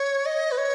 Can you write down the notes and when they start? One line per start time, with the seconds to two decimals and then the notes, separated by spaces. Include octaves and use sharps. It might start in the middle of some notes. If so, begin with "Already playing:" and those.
Already playing: C#5
0.26 D#5
0.51 B4
0.58 C#5